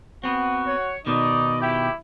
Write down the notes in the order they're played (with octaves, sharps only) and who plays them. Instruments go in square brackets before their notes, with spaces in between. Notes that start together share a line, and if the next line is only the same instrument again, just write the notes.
[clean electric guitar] B3 C4 [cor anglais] F#4
[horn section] C#5
[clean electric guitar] B2 D#3 [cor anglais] D#4 [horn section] D5 D#5
[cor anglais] E4 [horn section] G4